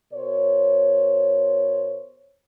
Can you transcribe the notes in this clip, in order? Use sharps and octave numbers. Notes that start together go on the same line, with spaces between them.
B2 A#4 C5 C#5